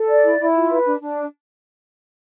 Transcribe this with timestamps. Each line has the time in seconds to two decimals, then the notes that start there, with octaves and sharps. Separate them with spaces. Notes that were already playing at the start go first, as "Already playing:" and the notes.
Already playing: A4
0.08 D5
0.24 E4
0.39 E4
0.54 F4
0.70 B4
0.85 D4
1.00 D4